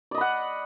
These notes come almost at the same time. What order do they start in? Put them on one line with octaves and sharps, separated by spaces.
D5 D#5 B5 F#5